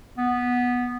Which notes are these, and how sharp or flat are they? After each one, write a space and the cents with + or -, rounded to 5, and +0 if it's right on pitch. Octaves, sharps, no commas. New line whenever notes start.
B3 -5